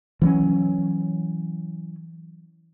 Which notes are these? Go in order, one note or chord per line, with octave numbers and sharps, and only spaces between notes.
E3 F#3 A3 C#4